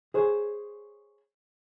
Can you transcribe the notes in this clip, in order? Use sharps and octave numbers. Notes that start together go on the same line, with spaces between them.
G#4 C5 C#5